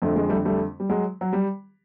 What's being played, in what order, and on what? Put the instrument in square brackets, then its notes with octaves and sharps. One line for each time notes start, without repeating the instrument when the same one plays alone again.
[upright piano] F2 D3 A3
G#3
G3 A3
G3 A3
G3
F#3 G#3
F#3
G3